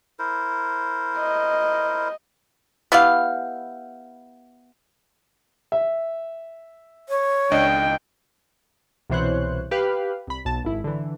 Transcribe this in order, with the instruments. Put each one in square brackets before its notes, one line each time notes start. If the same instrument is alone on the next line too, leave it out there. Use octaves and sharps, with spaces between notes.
[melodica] E4 A#4 C5
[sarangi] D#5
[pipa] B3 E4 G4 F5
[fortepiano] E5
[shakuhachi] C#5
[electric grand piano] C#2 D4 D#5 [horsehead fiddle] G5
[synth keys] C2 B2 E3 C5 C#5 F#6
G4 B4 F5
C2 B5
B1 A5
G#1 E4
D3 E3